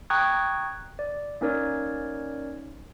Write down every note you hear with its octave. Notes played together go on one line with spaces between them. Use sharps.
G5 A#5 C#6 D#6 F#6 G#6
D5
A#3 C#4 D#4 A#4 C#5 D5